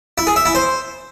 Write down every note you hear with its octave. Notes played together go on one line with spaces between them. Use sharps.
E4
G#4
E5
E4
C5